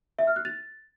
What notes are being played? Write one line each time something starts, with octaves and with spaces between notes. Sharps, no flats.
E5
F6
F#6
A6